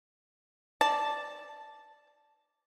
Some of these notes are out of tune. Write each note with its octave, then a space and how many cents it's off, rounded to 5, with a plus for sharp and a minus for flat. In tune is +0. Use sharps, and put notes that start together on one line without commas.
D5 +0 A5 -5